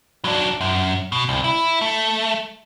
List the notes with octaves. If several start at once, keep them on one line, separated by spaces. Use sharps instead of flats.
F#3 D4
F#2
B2
C2
E4
A3